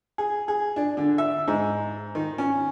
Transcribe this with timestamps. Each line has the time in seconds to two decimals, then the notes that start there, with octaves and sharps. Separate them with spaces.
0.18 G#4
0.48 G#4
0.76 D4
0.97 D3
1.18 E5
1.48 G#2
2.15 D#3
2.38 C#4